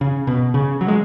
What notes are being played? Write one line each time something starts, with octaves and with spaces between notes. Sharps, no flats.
C#3
B2
C#3
F#3
G#3